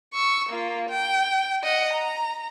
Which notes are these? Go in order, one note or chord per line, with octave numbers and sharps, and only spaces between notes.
C#6 E6
A#3 F4
G5
D#5 F#5
A#5